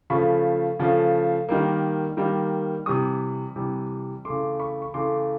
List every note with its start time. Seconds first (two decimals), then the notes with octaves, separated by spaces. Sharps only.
0.10 C#3 F3 A3 B5 C#6
0.79 C#3 F3 A3
1.49 D#3 G3 A#3
2.17 D#3 G3 A#3
2.86 C3 E3 G3 C#6 D#6
3.56 C3 E3 G3
4.25 C#3 E3 A3 C6 D6
4.60 B5 C#6
4.82 C#6
4.94 C#3 E3 A3 C6 D6